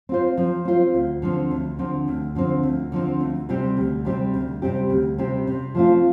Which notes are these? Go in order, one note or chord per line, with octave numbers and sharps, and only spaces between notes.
C4 F4 C5
F3
C4 F4 C5
D2
D3 F3 C4
D2
D3 F3 C4
D2
D3 F3 C4
D2
D3 F3 C4
D2
C3 G3 C4 G4
D2
C3 G3 C4 G4
D2
C3 G3 C4 G4
D2
C3 G3 C4 G4
C3
F3 A3 C4 F4